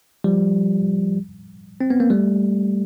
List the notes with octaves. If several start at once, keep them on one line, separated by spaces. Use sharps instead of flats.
F3 G3
C4
B3
A#3
G3 A3